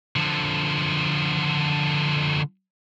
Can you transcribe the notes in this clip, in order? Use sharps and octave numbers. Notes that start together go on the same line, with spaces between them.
D3 F3